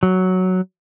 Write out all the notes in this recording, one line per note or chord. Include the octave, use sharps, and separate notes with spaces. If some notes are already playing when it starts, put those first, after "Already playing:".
F#3